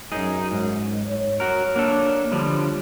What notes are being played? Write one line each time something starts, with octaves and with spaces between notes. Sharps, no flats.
F#2 D#4 G#4
G#2
C#5
F#4 A#4
A#3 D4 A4
D3 F3 G3